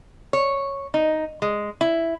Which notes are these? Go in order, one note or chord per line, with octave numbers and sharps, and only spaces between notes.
C#5
D#4
G#3
E4